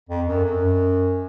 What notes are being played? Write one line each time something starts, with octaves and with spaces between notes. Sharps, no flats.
F2
F#2
F#2